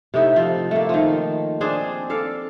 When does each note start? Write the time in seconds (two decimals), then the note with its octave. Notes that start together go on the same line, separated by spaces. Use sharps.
0.14 C3 A3 D#4 E4
0.36 F3
0.71 A3 A#3
0.89 D#3 F3
1.61 C4 D4 G#4
2.10 A4 D5 F5